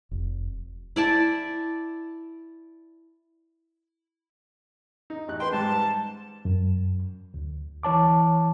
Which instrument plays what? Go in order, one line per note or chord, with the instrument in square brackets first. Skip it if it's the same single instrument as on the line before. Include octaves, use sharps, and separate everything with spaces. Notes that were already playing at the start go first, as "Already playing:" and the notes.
[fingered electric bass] F1
[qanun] E4 D5 A5
[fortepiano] D#4
A1 F#6
[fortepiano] B4 G5 [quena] C6
[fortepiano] G#2 G3 [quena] A5
[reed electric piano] F#2
D2
E3 C#5 A5 D6